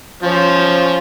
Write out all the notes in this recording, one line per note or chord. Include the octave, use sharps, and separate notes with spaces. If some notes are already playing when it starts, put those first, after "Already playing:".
F3 C#4 C5